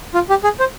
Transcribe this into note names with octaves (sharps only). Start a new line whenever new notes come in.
F4
G4
G#4
C5